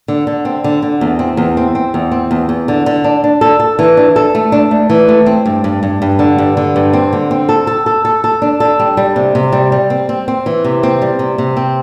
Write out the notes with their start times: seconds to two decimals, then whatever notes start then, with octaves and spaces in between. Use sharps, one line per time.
0.08 D3
0.27 D3
0.45 C4
0.64 D3
0.82 D3
1.01 E2
1.19 C4
1.37 E2
1.57 C4
1.75 C4
1.94 E2
2.12 C4
2.31 E2
2.49 E2
2.68 D3
2.86 D3
3.04 D4
3.24 D4
3.41 A4
3.60 A4
3.79 E3
3.97 D4
4.16 A4
4.35 A3
4.52 D4
4.71 A3
4.90 E3
5.09 A3
5.26 C4
5.46 G2
5.64 G2
5.83 G2
6.02 G2
6.19 D3
6.38 G2
6.57 D3
6.76 G2
6.93 C4
7.13 D3
7.31 C4
7.49 A4
7.67 A4
7.86 A4
8.05 A4
8.24 A4
8.42 D4
8.60 A4
8.80 G3
8.97 G3
9.16 C3
9.35 C3
9.52 G3
9.72 G3
9.90 C4
10.09 C4
10.28 C4
10.46 E3
10.65 C3
10.83 C4
11.02 G3
11.19 C3
11.38 C3
11.57 C4